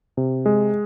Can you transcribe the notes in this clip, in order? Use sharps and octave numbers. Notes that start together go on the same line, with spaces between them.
C3
G#3